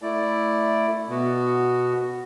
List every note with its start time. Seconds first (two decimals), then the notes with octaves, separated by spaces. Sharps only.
0.02 A3 E4 D5
1.08 B2 B3 F#4